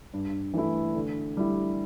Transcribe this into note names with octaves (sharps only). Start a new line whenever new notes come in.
G2
E3 A3 E4
D3
G3 E4